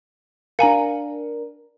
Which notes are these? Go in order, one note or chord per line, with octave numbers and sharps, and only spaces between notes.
D4 A#4 F5 G#5 A#5